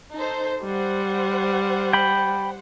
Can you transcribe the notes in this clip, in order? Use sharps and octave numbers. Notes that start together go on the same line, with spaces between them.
D#4 A4 C5
G3 C5 F#5
G5 B5